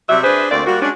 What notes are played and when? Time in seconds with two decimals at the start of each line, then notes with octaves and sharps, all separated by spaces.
0.09 C3 F#3 G3 E5
0.23 D4 G#4 B4 C5
0.51 D2 A#3 C4 D5
0.66 G3 A#3 F#4
0.82 G#3 C#4 D4